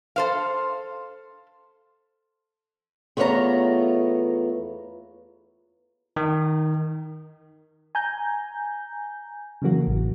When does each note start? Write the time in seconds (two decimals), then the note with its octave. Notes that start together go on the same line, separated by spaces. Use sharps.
0.16 A4 C5 F5
3.17 E2 A3 B3 F4 C#5 A#5
6.16 D#3
7.95 G#5 A#5 G6
9.62 C#3 E3 F#3 A#3 F#4
9.87 A1